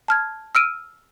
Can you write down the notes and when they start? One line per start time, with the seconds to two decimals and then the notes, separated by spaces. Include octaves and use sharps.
0.08 A5 F6 G#6
0.55 E6 F6 D7 D#7